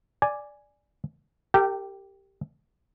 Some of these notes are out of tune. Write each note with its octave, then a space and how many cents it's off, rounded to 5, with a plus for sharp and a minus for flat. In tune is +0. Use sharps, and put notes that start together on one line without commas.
D5 +0 G#5 +0
G4 +0 A#4 -40 G5 -20